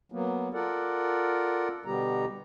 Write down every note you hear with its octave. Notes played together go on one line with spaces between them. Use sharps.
F#3 A#3 B3
F4 A4 A#4 D5 F#5
B2 D3 G3 B3 G4 A#5